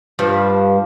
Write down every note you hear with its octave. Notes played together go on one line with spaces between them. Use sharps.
G2 F3